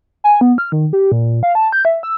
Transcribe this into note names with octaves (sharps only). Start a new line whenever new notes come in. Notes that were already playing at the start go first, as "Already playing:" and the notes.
G#5
B3
F6
D#3
G4
A#2
F5
A5
G6
E5
E6